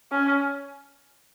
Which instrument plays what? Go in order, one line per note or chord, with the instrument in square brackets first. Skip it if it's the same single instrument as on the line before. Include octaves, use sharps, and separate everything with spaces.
[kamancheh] C#4